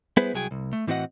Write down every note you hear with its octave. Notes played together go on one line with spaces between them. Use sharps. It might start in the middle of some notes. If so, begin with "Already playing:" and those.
G3 B3 E4 G#4 B4 C5
C2 F#3 G#4 G5 G#5
C2
A3
A2 E3 C4 F#4 D#5 F#5